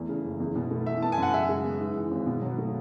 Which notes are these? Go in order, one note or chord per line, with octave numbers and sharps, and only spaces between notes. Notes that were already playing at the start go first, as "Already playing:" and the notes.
Already playing: E2 A3
C#3
F#1
E2
B2
A3
E3 E5
B3 A5
G#5
F#2 F#5
C#3 E5
G#3
B3
G#2
E3
G#1
B2
F#3
A3